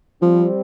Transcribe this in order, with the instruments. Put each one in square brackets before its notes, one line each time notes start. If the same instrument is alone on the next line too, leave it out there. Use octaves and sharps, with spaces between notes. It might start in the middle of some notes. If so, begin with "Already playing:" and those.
[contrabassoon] F3 [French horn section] G3 C4